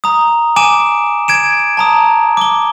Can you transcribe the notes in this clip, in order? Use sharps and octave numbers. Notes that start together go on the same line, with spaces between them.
A#5 D#6
G#5 D6 D7 E7
G#6 D7 E7
A5 A#5 D#6
D6 G7